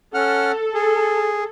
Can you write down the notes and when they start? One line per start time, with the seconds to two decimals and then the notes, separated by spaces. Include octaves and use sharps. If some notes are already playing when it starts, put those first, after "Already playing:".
0.14 C#4 A4 F#5 F6
0.74 G#4